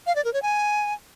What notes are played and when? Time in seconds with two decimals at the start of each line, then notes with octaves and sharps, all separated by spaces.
0.07 F5
0.16 D5
0.25 A#4
0.33 C#5
0.42 G#5